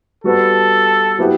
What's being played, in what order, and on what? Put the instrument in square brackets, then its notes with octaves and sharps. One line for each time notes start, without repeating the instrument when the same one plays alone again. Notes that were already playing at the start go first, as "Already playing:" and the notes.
[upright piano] G3 B3 F#4 B4 [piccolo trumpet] A4
[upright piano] F#3 B3 E4 G4 B4